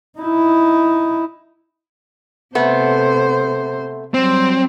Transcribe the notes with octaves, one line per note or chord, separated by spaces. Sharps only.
D#4 E4
C3 A3 B3 C5
F#3 G3 C4